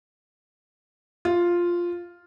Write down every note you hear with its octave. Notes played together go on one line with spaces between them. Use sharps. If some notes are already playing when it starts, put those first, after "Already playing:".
F4